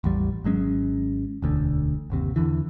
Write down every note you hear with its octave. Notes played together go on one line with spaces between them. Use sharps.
A1 E2 G3
G#1 F#3 G#3 C#4
E1 D2 D3
G1 D#2 C3
E2 D3 E3